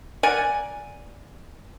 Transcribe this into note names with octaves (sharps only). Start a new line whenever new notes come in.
A#4 D5 F#5 G#5